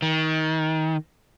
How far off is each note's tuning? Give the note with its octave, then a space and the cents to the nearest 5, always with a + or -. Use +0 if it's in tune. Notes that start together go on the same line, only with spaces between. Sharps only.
D#3 +25